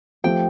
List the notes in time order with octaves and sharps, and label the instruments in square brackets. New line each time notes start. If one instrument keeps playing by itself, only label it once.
[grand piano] F3 A3 C4 G4 [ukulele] G5